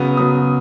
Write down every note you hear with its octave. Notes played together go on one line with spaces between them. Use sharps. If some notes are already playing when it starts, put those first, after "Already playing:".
Already playing: C#3 F#3 B3 D#6
C#3 F#3 B3 D#6